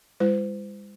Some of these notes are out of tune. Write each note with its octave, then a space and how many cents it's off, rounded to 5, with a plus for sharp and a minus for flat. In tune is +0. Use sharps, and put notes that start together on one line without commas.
G#3 -45 E4 +40 C5 -35